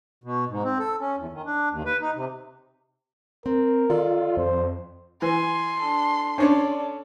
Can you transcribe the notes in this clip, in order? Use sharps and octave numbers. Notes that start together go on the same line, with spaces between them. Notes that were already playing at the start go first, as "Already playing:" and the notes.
B2
G#2
C4
A4
C#4
E2
D#3
D4
D#2
B4
D#4
C3
C4 A#4
D#3 F4 A4 D5
F2 C5
E3 G#5 C6
D4 A4
C#4 D4 A4 C#5 D5